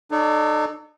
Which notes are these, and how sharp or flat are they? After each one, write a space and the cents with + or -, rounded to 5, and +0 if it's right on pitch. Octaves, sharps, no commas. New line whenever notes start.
D#4 -40 A4 -5 D5 -40